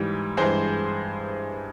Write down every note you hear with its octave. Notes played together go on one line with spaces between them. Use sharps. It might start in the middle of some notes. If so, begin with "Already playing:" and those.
Already playing: G#2 E3 G3
G2 E3 G#3 G#4 C5